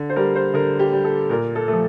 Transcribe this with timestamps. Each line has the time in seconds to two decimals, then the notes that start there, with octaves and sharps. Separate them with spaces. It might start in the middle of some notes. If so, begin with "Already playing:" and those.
Already playing: D3
0.10 C5
0.16 G3 A#4
0.36 C5
0.54 D3 A#4
0.79 G4
0.93 G3
1.04 A4
1.30 A#2 A#4
1.55 A4
1.68 F3 A3